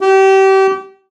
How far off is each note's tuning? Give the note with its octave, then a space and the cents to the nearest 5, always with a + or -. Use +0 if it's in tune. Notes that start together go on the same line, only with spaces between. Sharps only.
G4 -30